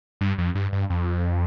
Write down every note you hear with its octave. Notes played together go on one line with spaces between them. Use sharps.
G2
F2
G2
G2
F2